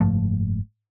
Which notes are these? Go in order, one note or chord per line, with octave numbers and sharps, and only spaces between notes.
F#1 G#2 F3 A3